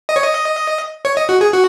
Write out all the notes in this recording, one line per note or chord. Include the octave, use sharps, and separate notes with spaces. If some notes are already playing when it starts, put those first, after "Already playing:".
D#5
C#5
D#5
C#5
D#5
F#4
G#4
F#4